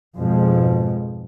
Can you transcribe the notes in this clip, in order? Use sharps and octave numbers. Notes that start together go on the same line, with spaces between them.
F2 G#2 B2 F3 G#3